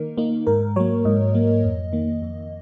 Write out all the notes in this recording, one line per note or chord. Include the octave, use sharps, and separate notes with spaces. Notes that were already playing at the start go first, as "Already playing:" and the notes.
Already playing: D#3 A#3 D#4 A#4
A#3 D#4
G#2 A#4
F#3 A#3 C#5
G#2 D#5
F#3 A#3
F2
D#3 A#3
F2